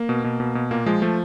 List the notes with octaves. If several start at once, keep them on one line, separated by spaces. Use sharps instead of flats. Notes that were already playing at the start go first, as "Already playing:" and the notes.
Already playing: A#3
B2
B2
B2
B2
A#2 A#3
F3 G#3
F3 A3